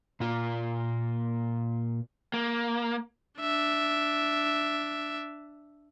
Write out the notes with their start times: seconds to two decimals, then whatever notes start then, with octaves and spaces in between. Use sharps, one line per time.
0.20 A#2 A#3 F4
2.34 A#3
3.40 D4 E5